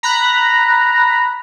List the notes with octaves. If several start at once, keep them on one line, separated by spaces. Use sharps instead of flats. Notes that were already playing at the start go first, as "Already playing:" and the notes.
A#5 B5 F#6